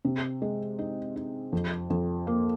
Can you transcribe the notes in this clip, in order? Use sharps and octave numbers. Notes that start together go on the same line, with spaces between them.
C3
G#3
D#4
D#4
F2
F2
A#3